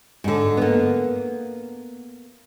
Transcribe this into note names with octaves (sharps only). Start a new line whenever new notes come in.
G#2 D3
A#3 B3